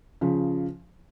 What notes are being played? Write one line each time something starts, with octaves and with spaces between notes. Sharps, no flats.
C#3 F3